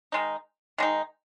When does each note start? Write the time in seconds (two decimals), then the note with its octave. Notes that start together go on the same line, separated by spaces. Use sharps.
0.12 D#3 G#3 D#4
0.78 D#3 G#3 D#4